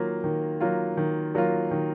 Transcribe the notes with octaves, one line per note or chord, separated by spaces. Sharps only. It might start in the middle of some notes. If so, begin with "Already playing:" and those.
Already playing: D#3 F#3 A#3 F4
D#3
F#3 A#3 F4
D#3
F#3 A#3 F4
D#3